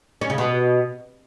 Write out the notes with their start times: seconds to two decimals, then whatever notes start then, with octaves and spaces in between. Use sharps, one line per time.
0.21 C#4
0.30 C#3
0.38 B2